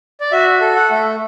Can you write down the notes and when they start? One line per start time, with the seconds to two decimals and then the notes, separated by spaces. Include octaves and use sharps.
0.21 D5
0.32 F#4 E5
0.61 A4
0.76 F#5
0.91 A3